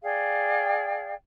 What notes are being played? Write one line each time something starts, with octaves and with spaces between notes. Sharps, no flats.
G#4 D5 F5 G5